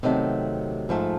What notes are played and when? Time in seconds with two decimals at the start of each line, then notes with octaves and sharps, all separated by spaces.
0.03 C3 D#3 F#3 A3
0.89 G#2 F3 A3